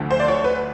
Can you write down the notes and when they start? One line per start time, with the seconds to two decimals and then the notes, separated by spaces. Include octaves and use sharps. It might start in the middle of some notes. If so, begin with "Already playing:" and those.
Already playing: D2 D3 F3 A3
0.11 C5
0.20 D5
0.28 C#5
0.44 B4